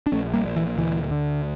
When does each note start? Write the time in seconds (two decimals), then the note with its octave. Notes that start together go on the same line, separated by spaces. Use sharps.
0.06 D4
0.12 A#1 A3 C#4
0.34 G3 A#3
0.45 A#2
0.56 E3
0.78 D2 E3
1.11 D3